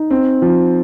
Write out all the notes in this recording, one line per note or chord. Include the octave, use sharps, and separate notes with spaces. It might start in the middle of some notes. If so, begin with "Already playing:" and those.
Already playing: D#4
C4
F3